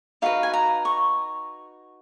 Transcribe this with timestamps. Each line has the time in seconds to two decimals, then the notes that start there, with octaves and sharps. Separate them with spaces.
0.22 D#4 F#4 B4 F5
0.43 G#5
0.54 A#5
0.85 C#6